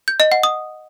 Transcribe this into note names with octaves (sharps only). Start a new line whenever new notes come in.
G6
D#5
F#5
D#6